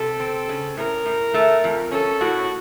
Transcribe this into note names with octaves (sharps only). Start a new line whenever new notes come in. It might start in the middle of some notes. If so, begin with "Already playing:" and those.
Already playing: C3 A4
C4
C#3
A2 A#4
A2
A3
F2
C#4 A4
A2 F#4